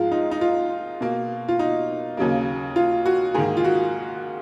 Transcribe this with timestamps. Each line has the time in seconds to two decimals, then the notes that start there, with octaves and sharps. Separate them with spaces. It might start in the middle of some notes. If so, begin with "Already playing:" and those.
Already playing: G#2 F3 G#3 F4
0.12 D#4
0.31 D#4
0.41 F4
1.01 B2 A#3
1.48 F4
1.59 D#4
2.17 D#2 C#3 F#3 A#3
2.76 F4
3.06 F#4
3.34 G#2 D#3 A#3 G#4
3.57 F4
3.64 F#4